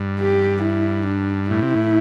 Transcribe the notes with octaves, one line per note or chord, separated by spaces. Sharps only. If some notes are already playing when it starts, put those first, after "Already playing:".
Already playing: G2
G4
E4
D4
A2 E4
C3
A2